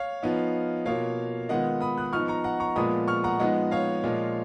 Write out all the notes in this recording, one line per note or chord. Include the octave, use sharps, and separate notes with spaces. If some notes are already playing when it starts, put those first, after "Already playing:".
Already playing: C#5 F5
F3 B3 D#4
B2 A#3 F4 C#5 F5
D#3 G#3 B3 F4 D#5 F#5
B5 D#6
D#6 F#6
F3 B3 D#4 C#6 F6
A#5 C#6
F#5 A#5
A#5 C#6
A#2 F3 G#3 B3 B5 D#6
C#6 F6
F#5 A#5
F3 G#3 B3 D#4 D#5 F#5
C#5 F5
A#2 F3 G#3